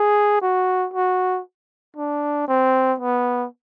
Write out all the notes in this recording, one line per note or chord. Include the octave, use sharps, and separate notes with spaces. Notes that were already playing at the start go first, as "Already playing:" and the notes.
Already playing: G#4
F#4
F#4
D4
C4
B3